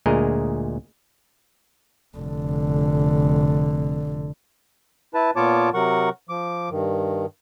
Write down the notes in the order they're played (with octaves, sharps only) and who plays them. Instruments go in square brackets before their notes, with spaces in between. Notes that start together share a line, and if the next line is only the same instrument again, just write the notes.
[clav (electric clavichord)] D2 A#2 G#3 G#4 A#4 D#5
[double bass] F1 D3
[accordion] E4 B4 A5
A#2 B3 F4 C#5 A5 D6
C3 F#3 A#4 F#5 C#6
F3 D6
G2 D#3